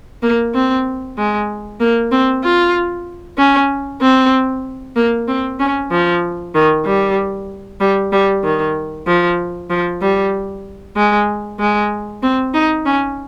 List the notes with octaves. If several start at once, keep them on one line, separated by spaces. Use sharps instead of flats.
A#3
C4
G#3
A#3
C4
F4
C#4
C4
A#3
C4
C#4
F3
D#3
G3
G3
G3
D#3
F3
F3
G3
G#3
G#3
C4
D#4
C#4